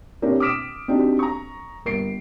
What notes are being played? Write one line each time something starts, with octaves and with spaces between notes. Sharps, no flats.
C4 D4 E4 G4 A#4 C#5
D6 D#6 F6 B6 D7 E7
C4 D4 D#4 F#4 G4
A#5 C#6
G1 A#4 C7 D7